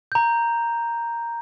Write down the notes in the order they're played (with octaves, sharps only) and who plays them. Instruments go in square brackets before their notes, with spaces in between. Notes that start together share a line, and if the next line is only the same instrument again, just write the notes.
[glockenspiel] A#5 G6